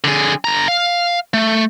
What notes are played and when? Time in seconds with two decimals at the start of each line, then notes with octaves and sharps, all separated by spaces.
0.04 D3 G#4
0.44 D3 A#5
0.68 F5
1.34 A3